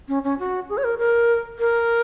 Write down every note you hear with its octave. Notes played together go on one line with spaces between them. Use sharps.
C#4
C#4
F#4
G#4
C#5
A#4
A#4
A#4